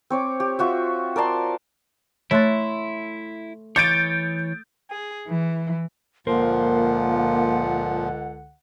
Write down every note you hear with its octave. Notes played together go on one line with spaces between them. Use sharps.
C4 C#5 D6
G4
F4 F#4 E5
A#4 D5 A5 C6
A3 E4 C#5 C6 F#6 A6
E3 C#5 D6 G6 A6 D7
G#4
E3
C#2 A#2 D3 F3 A#3 A#4 C5 F#5